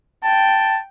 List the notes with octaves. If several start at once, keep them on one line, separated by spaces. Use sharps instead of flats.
G5 A5